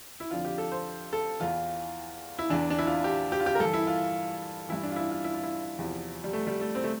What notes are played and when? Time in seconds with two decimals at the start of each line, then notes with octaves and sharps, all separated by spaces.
0.20 E4
0.31 F2 D3 F3 F4
0.45 G4
0.58 A4
0.72 C5
1.13 A4
1.40 E2 E3 F4
2.39 E4
2.50 E2 E3 D4
2.70 D4
2.78 E4
2.87 F4
3.04 G4
3.32 G4
3.40 F4
3.46 G4
3.55 A#4
3.60 G2 E3 A4
3.73 E4
3.87 F4
4.69 G2 E3 E4
4.83 D4
4.91 F4
4.96 E4
5.11 F4
5.24 E4
5.34 F4
5.43 E4
5.79 E2 C3 F3
6.24 G3
6.33 A3
6.47 G3
6.61 A3
6.75 C4
6.84 A3